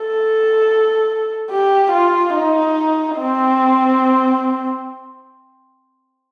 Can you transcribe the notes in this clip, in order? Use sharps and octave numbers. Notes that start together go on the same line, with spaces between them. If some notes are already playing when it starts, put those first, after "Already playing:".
Already playing: A4
G4
F4
D#4
C4